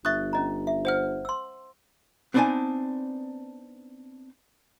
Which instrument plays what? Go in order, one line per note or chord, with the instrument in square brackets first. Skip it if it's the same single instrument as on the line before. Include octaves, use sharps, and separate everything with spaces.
[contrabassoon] G1 [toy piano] E5 C#6 D#6 [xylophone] F#6 A6
[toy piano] C#4 D#5 A#5
E5
[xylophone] C5 F#5 F6
[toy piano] C6 E6
[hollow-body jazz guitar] B3 C4 D4 D#4 G#5 A5